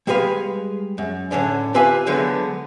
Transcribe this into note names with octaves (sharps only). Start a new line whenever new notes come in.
G3 G#3 G#4 B4 F5
F#2
A2 D3 C#4 D4
F4 G4 B4 E5 F5 G#5
D3 F3 F#3 G#3 A3 B3